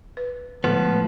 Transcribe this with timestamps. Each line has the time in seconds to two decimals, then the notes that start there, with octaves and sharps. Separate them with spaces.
0.17 B4
0.64 A2 D3 F3 G#3 B3 A4